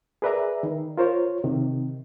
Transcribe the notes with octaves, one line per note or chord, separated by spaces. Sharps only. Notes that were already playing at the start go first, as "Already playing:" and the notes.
G#4 A#4 B4 D5 E5 A#5
D#3
F4 A#4 C5 C#5
C3 D#3